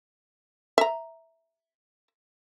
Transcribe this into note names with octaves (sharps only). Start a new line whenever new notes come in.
E5 A#5